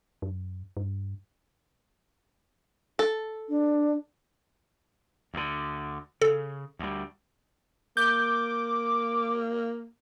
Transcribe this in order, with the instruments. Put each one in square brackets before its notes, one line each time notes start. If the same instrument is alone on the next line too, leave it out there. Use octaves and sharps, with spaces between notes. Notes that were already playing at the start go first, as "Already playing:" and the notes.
[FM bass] F#2
G2
[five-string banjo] A4
[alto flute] D4
[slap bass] D2 D3
[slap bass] C#3 [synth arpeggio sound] A4
[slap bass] D2 G3
[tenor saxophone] A#3 [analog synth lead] D6 [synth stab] G6